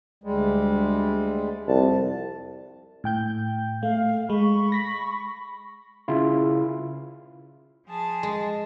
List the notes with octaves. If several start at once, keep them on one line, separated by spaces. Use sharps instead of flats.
D2 G3 G#3
C2 F2 A5
A2 G5 G6
A3 F5
G#3 B5 C#6
A#6 B6
C#3 E4 F4
F3 G#4 A5
G#3